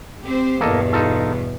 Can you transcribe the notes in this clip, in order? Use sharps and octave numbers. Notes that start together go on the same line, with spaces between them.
C4 G4 C5
E2 G2 B2 A#3 A4 D#5
D#4 F4 A4